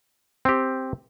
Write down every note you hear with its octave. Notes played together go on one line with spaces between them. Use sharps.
C4 G4